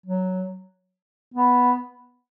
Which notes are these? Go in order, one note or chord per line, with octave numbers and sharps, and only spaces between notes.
F#3
B3